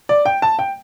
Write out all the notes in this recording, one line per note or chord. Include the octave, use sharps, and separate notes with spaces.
D5
G5
A5
G5